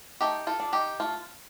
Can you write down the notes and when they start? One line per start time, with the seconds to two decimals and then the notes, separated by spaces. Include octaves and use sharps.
0.21 A3 D#4 G4
0.47 F4 A4
0.60 D4
0.73 D#4 G4
1.00 A3 F4